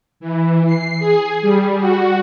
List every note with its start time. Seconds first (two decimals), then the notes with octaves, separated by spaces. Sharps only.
0.20 E3
0.66 C7
0.99 G#4
1.42 G3
1.80 F#4